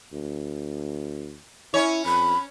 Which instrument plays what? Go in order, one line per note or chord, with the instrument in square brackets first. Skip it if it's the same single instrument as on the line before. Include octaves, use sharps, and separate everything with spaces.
[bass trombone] D2
[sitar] C#4 C#5 [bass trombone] E4
[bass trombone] F2 [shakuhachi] B5